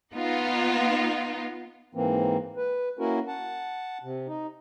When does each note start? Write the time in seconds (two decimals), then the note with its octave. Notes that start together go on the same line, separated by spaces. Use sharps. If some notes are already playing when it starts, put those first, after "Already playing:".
0.15 B3 D#4 F4
1.95 G#2 E3 A#3 C4
2.57 B4
2.99 A#3 C#4 E4 F#4 A#4
3.28 F#5 A5
4.03 C3
4.28 D#4